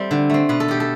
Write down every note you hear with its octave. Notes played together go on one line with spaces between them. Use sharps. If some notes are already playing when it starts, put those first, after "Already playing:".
Already playing: G3 A3 C4 E5
D3
A3 C4
B2 B4
A4
B3 G4
A4